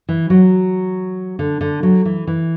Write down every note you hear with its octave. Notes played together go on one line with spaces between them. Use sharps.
E3
F#3
D3
D3
F#3
E3
E3